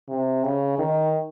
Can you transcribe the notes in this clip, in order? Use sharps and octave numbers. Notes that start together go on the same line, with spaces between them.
C3
C#3
D#3